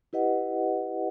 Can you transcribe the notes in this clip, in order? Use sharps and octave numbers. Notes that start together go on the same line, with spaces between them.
E4 G4 B4 D#5 F#5